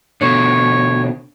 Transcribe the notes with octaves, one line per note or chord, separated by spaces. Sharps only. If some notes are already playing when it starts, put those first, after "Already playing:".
B2 D3 C#5